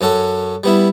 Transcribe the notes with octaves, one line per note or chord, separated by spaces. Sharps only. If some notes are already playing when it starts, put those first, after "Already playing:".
F#2 C#4 A4 F#5
G3 B3 E4